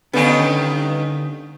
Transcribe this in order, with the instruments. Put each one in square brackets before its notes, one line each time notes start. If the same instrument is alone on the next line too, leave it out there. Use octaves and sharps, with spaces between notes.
[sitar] G2 D#3 D#4 [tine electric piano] D3 [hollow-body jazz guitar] B3 C#4